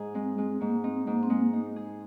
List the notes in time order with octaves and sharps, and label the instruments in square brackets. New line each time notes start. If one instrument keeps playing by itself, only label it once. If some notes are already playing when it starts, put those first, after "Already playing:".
Already playing: [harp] G#2 G#4
[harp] G#3 [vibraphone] C4
[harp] G#3 [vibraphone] C4
[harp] G#2 [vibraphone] A#3
[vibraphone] C4 [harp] D#4
[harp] G#2 [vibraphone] A#3
[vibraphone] C4
[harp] G#3 [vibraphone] A#3
[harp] D#4
G#4